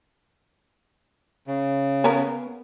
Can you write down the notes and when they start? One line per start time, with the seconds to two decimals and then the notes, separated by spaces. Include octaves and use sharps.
1.47 C#3
2.04 B3 C#4 A#4